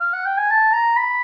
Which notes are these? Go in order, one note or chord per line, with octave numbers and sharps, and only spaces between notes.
F5
F#5
G5
G#5
A5
A#5
B5